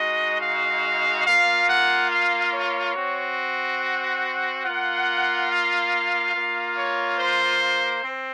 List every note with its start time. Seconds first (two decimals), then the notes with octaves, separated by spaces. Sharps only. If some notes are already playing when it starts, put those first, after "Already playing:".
Already playing: G#3 D#4 F#4 D#5
0.41 F5
1.25 A#3 F4 F5
1.68 F#5
2.10 F5
2.52 C#5
2.94 C4 F#4
3.79 F#5
4.63 A#3 F4 F#5
5.48 F5
6.33 A#3 F4
6.75 C#5
7.18 C5
8.02 C4